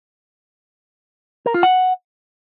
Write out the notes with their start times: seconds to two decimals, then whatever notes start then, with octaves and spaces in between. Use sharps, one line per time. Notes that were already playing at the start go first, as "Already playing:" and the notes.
1.46 A#4
1.54 F4
1.63 F#5